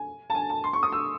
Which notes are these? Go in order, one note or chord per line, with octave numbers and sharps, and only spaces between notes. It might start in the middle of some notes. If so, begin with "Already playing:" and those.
Already playing: G#5
A5
G#5
A5
C6
C#6
D#6
E6